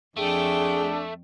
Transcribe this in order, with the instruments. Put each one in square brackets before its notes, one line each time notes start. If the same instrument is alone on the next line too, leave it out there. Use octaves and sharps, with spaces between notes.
[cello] F2 G5 [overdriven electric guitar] A3 [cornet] D4 [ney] G#4